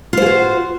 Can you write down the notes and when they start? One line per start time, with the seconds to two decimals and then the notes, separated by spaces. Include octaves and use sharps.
0.13 F4
0.17 C5
0.22 G#4
0.26 F#4